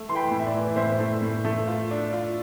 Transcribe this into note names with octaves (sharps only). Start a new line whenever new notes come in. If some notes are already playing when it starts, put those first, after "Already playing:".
Already playing: A3
E3 C6
G5 B5
A2
E5
D5
E3
A2 C5 E5
A3
A2
A3
F4
D4
F4